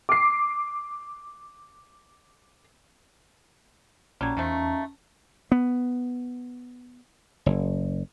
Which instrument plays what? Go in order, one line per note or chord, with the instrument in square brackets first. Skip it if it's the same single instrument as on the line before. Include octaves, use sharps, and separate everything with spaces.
[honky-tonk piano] D6 C7
[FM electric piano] A#1 A#2 G#6 [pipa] F#3 G3 [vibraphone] C#4 A5 A#5
[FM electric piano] E2 [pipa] D#3 F3 A3
[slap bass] B3
F#1